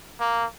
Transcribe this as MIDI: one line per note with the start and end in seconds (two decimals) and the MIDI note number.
0.20 0.45 58